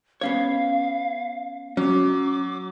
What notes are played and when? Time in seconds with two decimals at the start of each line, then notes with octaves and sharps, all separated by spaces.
0.21 B3 C#4 C#5 F5
1.77 F#3 C#4 D6